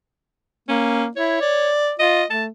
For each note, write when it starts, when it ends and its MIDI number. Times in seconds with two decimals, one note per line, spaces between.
0.69 1.08 58
0.69 1.04 61
1.17 1.38 64
1.17 1.71 73
1.41 1.93 74
1.99 2.23 65
1.99 2.25 75
2.31 2.48 57
2.31 2.44 81